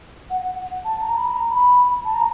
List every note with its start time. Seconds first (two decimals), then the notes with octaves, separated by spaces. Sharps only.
0.30 F#5
0.41 F#5
0.85 A5
1.01 A#5
1.17 B5
1.33 A#5
1.50 B5
2.04 A5
2.14 A#5